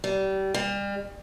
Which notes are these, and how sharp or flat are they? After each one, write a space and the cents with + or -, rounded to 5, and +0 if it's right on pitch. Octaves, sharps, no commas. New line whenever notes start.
G3 -25
G3 +35